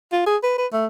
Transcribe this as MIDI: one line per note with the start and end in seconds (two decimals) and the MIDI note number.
0.13 0.26 65
0.26 0.36 68
0.43 0.55 71
0.58 0.66 71
0.72 0.86 57